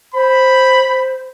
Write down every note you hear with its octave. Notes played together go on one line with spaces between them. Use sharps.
C5 B5